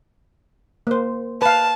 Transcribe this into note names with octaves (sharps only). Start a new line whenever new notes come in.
A#3 C5
B4 F5 A5